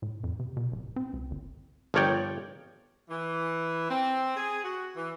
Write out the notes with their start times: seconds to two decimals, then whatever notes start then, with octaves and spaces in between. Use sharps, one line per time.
0.02 A2
0.24 F2
0.39 C3
0.57 B2
0.72 D1
0.96 C4
1.13 C#2
1.31 G1
1.94 G1 F3 A#4 C#5 D5 G5
3.10 E3
3.89 C4
4.36 G#4
4.62 F#4
4.96 E3